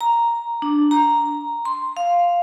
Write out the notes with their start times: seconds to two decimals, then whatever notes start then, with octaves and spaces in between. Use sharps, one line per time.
0.01 A#5
0.62 D4
0.91 A#5
1.65 C6
1.97 F5